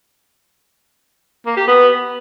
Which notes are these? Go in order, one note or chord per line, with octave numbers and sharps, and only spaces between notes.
A#3
G4
B3